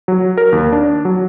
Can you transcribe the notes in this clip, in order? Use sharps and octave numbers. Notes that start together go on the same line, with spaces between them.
F#3
A#4
D#2
D4
F#3